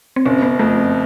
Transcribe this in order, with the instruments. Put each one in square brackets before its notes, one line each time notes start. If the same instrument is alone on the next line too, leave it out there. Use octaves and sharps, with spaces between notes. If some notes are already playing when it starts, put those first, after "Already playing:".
[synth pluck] C4
[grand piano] F#1 [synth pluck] C#4
[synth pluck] B3
[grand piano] F2 [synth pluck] A3